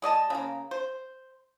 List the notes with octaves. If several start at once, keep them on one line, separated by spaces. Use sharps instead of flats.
G#3 D5 D#5 A5
C#3 A#3
C5